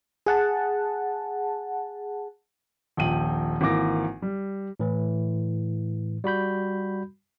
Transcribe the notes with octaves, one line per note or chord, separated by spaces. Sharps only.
G#4 F#5 A5
D#1 A#1 G5 D#7 F#7
G#1 E3 A#3 D6 A#6
G3
A2 E3
G3 F#4 B5 G6